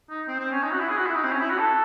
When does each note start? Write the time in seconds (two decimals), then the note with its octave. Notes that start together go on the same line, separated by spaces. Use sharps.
0.10 D#4
0.28 C4
0.39 C4
0.51 C#4
0.63 D#4
0.72 F#4
0.80 E4
0.89 G#4
0.98 F#4
1.07 E4
1.15 D#4
1.24 C4
1.32 C#4
1.41 E4
1.50 F#4
1.58 A4